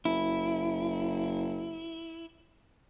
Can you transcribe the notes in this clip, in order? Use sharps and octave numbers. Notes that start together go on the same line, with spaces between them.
F#1 E4